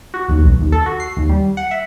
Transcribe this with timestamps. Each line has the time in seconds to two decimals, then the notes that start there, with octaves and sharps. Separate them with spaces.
0.14 F#4
0.29 D#2
0.43 B1
0.59 D#2
0.72 A4
0.86 F#4
1.00 C7
1.17 D#2
1.29 G3
1.57 F#5
1.71 E5